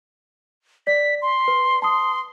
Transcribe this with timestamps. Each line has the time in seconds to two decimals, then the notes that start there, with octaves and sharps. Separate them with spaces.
0.87 D5 B6
1.22 C6
1.48 B4
1.82 A5 C6 D#6